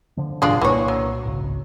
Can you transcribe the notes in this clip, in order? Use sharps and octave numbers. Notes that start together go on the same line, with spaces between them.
D3 F3
A1 G2 B2 G#3 D4 F4
C2 A#2 E3 A#3 C#5
F#3
G#1 C#2